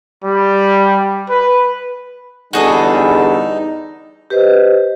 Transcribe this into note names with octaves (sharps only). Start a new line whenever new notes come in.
G3
B4
E2 D3 G3 D#4 F#4 G#4 A4
G4 B4 C5 D#5